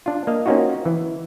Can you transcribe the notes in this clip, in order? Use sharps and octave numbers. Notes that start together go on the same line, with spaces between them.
D4 F4
A#3 D#5 F5
A#3 C4 C#4 D#4 F4 F#4
E3